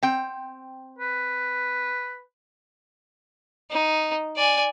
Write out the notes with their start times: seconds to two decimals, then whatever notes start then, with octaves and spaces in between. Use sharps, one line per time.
0.03 C4 G5
0.98 B4
3.71 D#4
4.37 D5 G#5